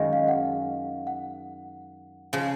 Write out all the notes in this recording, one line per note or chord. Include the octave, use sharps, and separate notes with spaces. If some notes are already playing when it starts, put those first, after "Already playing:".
Already playing: F#2 D#3 G#3 F5
F5
F#5
F#5
C#3 F3 F5